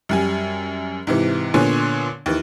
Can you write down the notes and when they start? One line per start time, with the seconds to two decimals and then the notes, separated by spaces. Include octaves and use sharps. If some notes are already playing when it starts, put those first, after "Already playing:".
0.09 F#2 G3 G#5
1.07 G#2 C3 E3
1.54 A#2 D3 B3 C#5 G#5 C6
2.26 D#2 E3